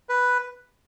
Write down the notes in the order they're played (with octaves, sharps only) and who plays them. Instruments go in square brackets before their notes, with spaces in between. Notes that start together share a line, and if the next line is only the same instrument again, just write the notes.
[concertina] B4